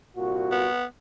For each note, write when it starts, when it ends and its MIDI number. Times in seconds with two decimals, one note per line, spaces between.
0.17 0.67 36
0.17 0.67 46
0.17 0.67 66
0.52 0.84 59